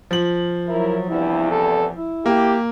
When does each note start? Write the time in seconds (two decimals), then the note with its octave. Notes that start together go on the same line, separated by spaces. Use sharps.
0.11 F3 F#7
0.68 F#3 E4 A#4
1.09 E2 G2 C3 E4
1.50 A4
1.93 E4
2.26 A#3 G4